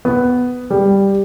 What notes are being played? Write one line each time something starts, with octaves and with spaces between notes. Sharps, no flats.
B3
G3